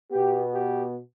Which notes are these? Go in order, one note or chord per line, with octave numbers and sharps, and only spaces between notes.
B2 B3 G4
G4